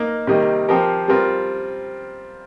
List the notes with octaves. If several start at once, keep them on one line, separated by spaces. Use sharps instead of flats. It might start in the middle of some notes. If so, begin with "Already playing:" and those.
Already playing: A#3 D#4 A#4
C3 D#3 G3 A#3 D#4
F3 C4 G4 A#4
G3 C4 F4 A#4